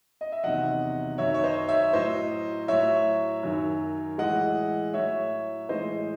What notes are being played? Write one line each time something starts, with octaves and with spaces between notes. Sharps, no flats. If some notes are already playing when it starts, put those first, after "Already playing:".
D#5
E5
E2 C3 D#3 F#3 D#5 F#5
F#2 D#3 F#3 C#5 E5
C#5
C5 D#5
C#5 E5
A2 F#3 C5 D#5
A2 F#3 C#5 E5
F#2 D#3 F#3
A2 E3 G#3 D#5 F#5
A2 F#3 C#5 E5
A2 E3 G#3 C5 D#5